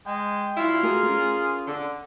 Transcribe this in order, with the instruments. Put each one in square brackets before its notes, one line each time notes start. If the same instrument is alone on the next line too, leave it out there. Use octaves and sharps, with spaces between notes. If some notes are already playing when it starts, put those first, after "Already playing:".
[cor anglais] G#3 [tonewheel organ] G5
[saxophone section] F#3 D4 E4 [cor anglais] F4
[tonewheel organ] A3 F#4 [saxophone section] G#4 A#4
[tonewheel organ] C#4
[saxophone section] D3